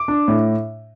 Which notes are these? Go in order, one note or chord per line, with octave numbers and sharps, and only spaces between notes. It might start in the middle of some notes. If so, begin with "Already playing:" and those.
Already playing: D6
D4
A2